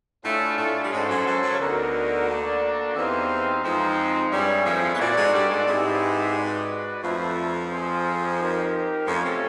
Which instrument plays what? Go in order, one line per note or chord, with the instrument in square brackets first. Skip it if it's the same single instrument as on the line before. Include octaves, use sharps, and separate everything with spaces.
[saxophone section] A2 A3 [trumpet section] D4 F4 G#4 C#5 F5
[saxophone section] A2 A3
G3
[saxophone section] G#2 G#3 [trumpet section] C#4 F#4 A4 C5
[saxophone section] F#2 F#3
F#2 F#3
F#2 F#3
C#3
[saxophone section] D2 D3 [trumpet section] B3 D#4 F#4 A#4
[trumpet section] A#3 D4 F#4 A4 D5
[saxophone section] E2 E3 [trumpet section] C4 D#4 G4 C5 F5
[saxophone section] F2 F3 [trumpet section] G#3 C4 D#4
[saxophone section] G2 G3 [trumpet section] E4 G#4 C#5
[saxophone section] F2 F3
B3
[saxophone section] A#2 A#3 [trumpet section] F#4 A4 D5
[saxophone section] G#2 G#3
G2 G3
G#2 G#3
[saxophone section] G#2 G#3 [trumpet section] C4 E4 G4 B4
[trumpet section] F#4 B4 D5
[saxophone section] F2 F3 [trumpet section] A3 D4 F#4 B4 E5
[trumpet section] C4 F4 G#4 C5
D#4 G4 A#4
[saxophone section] F2 F3 [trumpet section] A3 C#4 F4 A4 C#5
[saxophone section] C3